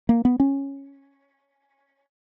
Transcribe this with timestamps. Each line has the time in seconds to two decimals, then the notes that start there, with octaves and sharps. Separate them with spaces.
0.09 A#3
0.25 B3
0.40 C#4